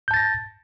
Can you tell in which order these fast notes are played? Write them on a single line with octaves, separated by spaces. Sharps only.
G6 A5 A6 A#6